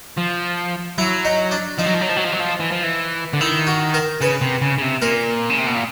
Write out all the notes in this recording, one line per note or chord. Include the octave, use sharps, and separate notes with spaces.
F3
F#3 E4
D#4
D4
F3 D#4
F#3
F3
F#3
F3
F#3
F3
F#3
F3
E3
F3
E3
D3
D#3 E4
F#4
A#4
C#3 B4
C3
C#3
C#3
C3
A#2 A#4
C#3
C3
B2
A#2